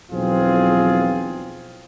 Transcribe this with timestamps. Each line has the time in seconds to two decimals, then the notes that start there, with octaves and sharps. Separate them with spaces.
0.11 B1 E2 F3 C4 F4 G#4